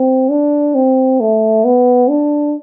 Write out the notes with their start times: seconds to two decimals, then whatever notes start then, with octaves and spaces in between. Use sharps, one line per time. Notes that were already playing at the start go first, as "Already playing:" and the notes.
Already playing: C4
0.31 D4
0.75 C4
1.20 A3
1.65 B3
2.09 D4